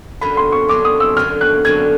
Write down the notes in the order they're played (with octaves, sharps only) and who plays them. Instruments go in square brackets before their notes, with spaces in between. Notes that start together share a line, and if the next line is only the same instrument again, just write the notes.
[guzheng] F#2 D3 F#3 [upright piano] B5
[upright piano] C6
C#6
[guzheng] F#2 D3 F#3 [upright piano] D6
[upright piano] D#6
E6
[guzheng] F#2 D3 F#3 [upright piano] F6
[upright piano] F#6
[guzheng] F#2 D3 F#3 [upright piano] G#6